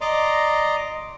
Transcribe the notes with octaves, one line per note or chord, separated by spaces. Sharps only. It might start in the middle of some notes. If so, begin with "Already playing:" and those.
D5 D#5 A#5 C6 D6